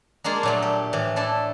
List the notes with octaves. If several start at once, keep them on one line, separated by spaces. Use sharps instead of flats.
G#3 A#3 D4 F4 G#4
A#2 F#3 A3
G4
A2 E3
A3 D4 E4 A4